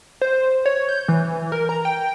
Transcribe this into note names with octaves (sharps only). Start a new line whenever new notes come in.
C5
C#5
G6
E3
A#4
A#5
G5